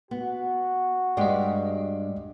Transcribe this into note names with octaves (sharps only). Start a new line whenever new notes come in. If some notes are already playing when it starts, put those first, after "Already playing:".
B3 F#4
G2 G#3 G4 D5 D#5